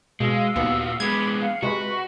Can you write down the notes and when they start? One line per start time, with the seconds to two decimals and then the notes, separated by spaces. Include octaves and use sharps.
0.20 B2 G#3 F5 E6
0.56 D#2 A#2 B3 F#4
1.00 G#3 B3 B5 D6 G#6
1.40 F5 F#5
1.62 C3 G#3 F#4 B4 C#6